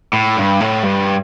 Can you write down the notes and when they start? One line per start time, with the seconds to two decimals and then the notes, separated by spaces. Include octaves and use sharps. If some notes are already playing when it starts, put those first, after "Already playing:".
0.13 A2
0.37 G2
0.61 A2
0.83 G2